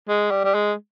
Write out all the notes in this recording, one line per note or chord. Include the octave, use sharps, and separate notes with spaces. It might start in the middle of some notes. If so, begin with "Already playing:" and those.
G#3
G3
G3
G#3